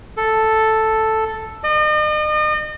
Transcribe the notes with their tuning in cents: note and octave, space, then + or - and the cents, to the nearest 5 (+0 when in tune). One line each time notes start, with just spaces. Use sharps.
A4 +0
D#5 -40